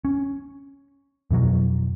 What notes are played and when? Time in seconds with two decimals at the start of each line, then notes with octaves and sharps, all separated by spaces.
0.05 C#4
1.31 F2 B2 E3 F#3